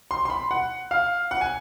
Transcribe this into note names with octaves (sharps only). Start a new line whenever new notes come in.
C6
C6
B5
F#5
F5
F#5
G#5